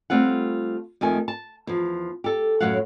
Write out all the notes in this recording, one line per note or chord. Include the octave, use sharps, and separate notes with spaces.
G3 A3 C4 F4 F#5
F2 D#3 A3 G#5
A5
E2 F3
G4 A4
F#2 A2 F#3 C#5 F5 F#5